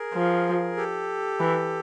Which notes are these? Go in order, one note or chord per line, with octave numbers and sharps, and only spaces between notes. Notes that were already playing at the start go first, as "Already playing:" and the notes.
Already playing: G#4 A#4
F3
G4 A4
E3